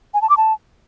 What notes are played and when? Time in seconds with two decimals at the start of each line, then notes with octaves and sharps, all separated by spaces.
0.14 G#5
0.22 A5
0.30 D6
0.37 A5